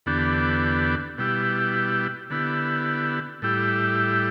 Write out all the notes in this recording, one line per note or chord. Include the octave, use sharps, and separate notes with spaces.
E2 D3 B3 D4 G4
B2 G3 E4 G4
D3 B3 E4 G4
A2 G3 E4 G4